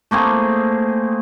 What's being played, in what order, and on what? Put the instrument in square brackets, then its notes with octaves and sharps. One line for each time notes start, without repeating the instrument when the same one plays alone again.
[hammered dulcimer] A3 A#3 C4 G#4